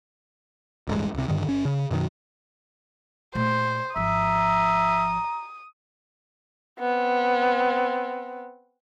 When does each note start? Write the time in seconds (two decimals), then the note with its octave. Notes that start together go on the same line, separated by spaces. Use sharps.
0.87 D1 A1 G2 G#3
1.14 C#2 C3
1.28 G2 D3 D#3
1.46 G1 C#4
1.65 C#3
1.91 F#2 B2 D#3 F#3
3.35 A#2 A3 C5
3.96 G#1 F3 E5 A#5 D#6
6.80 B3 C4